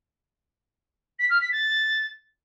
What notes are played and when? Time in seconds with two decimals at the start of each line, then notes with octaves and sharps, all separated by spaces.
1.19 B6
1.30 F6
1.41 B6
1.52 A6